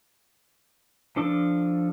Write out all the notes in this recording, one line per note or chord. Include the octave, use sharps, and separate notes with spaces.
F3 D4 A4 D6